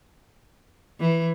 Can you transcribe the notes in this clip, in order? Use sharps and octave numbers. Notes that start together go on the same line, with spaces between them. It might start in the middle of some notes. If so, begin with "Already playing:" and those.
E3